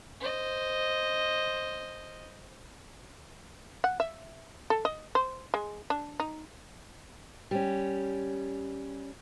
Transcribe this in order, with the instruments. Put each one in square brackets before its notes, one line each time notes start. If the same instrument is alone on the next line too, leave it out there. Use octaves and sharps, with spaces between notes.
[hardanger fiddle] C5 D#5
[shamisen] F#5
E5
A4
D#5
C5
G#3
D4
D#4
[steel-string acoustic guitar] G3 C#4